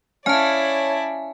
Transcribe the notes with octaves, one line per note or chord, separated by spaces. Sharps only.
C#4 E4 C#5 D5 F5 G#5 A5